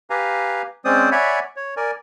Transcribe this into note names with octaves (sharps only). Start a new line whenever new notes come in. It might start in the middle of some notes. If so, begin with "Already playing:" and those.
G4 B4 F5 G#5 A#5
G#3 C4 C#4 C5 D5 D#6
C#5 D5 E5 F#5 G#5 B5
C#5
A#4 D5 G#5